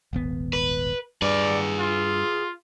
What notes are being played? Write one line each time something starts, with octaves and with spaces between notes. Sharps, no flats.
D#1 G#1 B3
B4
G2 G#4 B4 D5
F4